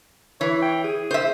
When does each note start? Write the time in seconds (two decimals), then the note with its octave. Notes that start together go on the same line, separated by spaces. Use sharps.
0.41 E3 C#5
0.62 G5
0.84 G#4
1.11 C5 E5